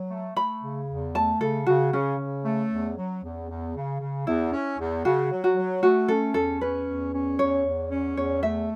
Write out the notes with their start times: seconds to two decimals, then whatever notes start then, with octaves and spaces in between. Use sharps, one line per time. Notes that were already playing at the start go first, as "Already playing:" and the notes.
Already playing: F#3
0.10 A3
0.36 A3 B5
0.63 C#3
0.88 E2
1.15 A3 A5
1.40 C#3 A4
1.66 C#3 F#4
1.92 C#3 C#4
2.19 C#3
2.45 A3
2.71 E2
2.97 F#3
3.23 E2
3.49 E2
3.75 C#3
4.01 C#3
4.26 E2 E4
4.53 C#4
4.79 E2
5.05 C#3 F#4
5.31 F#3
5.44 F#4
5.57 F#3
5.83 A3 F#4
6.08 C#4 A4
6.34 E2 A4
6.61 C#4 B4
6.87 E2
7.13 C#4
7.39 E2 C#5
7.65 E2
7.90 C#4
8.16 E2 C#5
8.42 A3 E5